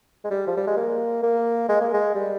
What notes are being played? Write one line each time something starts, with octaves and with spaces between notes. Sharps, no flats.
G#3
G3
F3
G3
G#3
A#3
A#3
G#3
A#3
G#3
G3